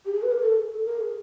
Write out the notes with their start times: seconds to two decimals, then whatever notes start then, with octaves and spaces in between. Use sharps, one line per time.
0.05 G4
0.13 G#4
0.23 B4
0.32 A#4
0.41 A4
0.57 G#4
0.72 A4
0.85 A#4
1.01 G#4